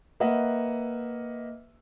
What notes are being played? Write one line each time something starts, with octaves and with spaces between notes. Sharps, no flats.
A#3 B4 D#5 E5 F#5